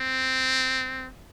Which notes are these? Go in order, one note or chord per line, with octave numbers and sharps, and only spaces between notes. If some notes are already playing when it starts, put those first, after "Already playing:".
Already playing: C4